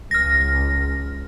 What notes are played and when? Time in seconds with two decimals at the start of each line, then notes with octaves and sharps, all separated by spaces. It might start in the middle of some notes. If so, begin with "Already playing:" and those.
0.11 C#2 F6 A#6